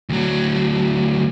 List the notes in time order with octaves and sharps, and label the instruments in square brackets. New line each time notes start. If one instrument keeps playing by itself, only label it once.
[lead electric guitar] D2 F#3